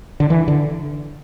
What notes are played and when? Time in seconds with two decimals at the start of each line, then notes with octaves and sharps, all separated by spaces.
0.20 D3
0.30 E3
0.48 D3